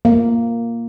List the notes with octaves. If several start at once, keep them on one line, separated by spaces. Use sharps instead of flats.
A#3